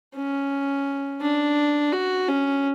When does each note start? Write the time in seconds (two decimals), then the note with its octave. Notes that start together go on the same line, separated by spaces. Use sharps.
0.16 C#4
1.22 D4
1.92 F#4
2.28 C#4